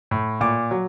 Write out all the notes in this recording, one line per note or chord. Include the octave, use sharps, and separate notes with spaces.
A2
A#2 D6
F#3